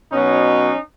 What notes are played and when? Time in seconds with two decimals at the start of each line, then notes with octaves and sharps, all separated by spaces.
0.13 B2 F#3 C#4 D#4